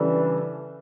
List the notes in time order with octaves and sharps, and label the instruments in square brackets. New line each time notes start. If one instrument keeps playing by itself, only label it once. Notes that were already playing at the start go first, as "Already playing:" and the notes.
Already playing: [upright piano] C#3 G3 D4 A4 [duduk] E3